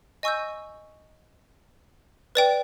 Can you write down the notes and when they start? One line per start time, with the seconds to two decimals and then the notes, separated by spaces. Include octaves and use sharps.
0.23 D#5 G#5 C#6 E6 G6
2.35 B4 D5 G5